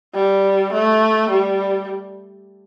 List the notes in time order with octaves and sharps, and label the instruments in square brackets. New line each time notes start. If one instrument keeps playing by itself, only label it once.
[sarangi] G3
A3
G3